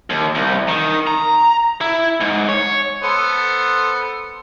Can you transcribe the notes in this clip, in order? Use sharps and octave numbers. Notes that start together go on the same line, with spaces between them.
D#2
C2
D#3
A#5
E4
G#2
C#5
B3 A4 C5